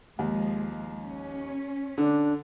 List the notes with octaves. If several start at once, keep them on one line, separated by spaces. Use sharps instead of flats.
D#2 F3 G#3
C#4
D3 D4